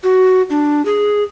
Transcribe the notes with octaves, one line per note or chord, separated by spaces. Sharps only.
F#4
D4
G#4